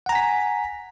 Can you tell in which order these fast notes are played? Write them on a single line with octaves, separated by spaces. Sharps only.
F#5 A#5 G#5 B6